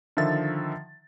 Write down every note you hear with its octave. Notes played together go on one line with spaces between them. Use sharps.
D3 D#3 F3 E5 A6